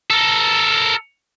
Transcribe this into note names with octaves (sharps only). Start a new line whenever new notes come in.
A4 A#4